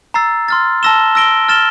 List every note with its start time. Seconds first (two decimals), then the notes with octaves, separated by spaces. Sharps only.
0.14 A#5 E6 A6 C7
0.48 C6 F6 A6
0.83 A5 E6 A#6 E7 G7
1.15 E6 A#6 D7 G7
1.48 F6 A6 E7 G7